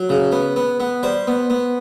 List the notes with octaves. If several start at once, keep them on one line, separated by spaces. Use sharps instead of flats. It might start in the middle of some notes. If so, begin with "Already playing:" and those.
Already playing: F#3
C#3
B3
B3
B3
G3 C5
B3
B3